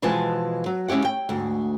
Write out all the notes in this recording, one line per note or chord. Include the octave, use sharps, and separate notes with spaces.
B2 E3 F3 G#3 G#5 A5
F#3
G#3 C#4 E4 G4 F#5
G5
D2 G#2